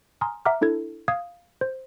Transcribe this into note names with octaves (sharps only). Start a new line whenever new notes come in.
G#5 A#5 C6 D#6 F6
E5 F#5 A#5 D6 F6
D4 E4 A4 G#6
F5 D#6 G#6
C5